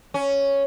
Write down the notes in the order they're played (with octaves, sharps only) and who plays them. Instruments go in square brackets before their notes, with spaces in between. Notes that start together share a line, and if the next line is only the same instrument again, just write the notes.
[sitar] C#4